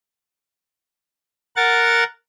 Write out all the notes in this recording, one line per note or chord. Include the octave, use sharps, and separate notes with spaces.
A#4 F#5 A6